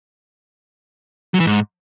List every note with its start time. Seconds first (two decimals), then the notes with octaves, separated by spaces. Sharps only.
1.34 F#3
1.40 E3
1.46 G#2